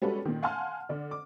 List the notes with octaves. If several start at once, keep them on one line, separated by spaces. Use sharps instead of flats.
G3 G#3 C#4 F#4 A4 B4
A#2 D#3
F5 F#5 G#5 A5 C6 F6
D3 D5
D6